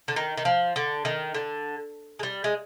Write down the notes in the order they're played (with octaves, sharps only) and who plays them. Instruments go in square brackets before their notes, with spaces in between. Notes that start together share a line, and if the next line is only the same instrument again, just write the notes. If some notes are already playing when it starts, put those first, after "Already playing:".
[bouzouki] D3
D#3
D#3
F3
D3
D#3
D3
G#3
G3
G#3